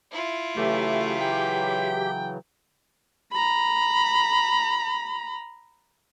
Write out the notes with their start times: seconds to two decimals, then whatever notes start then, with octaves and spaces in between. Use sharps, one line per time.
0.11 E4 F4
0.57 C#3 E3 F#3 A3 G4
1.21 G5
3.32 A#5 B5